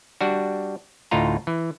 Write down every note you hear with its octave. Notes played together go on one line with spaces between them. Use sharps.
G3 D4 F#4
D2 A2 D#4 F4 A#5
E3